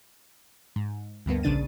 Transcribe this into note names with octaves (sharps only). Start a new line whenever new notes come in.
G#2
D2 G2 A#3 B3
A#1 C#3 D4 A6 D#7